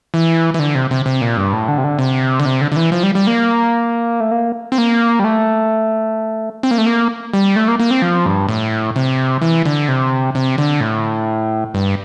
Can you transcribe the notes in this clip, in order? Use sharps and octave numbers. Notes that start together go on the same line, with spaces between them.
E3
E3
D3
C3
C3
C3
A#2
G2
A2
D3
C3
D3
C3
D3
C3
D3
D3
E3
F3
G3
G3
A#3
A3
A#3
C4
A#3
G3
A3
C4
A#3
A3
A#3
G3
A3
A#3
A#3
C4
F3
G2
A2
C3
E3
D3
C3
C3
D3
A2
G2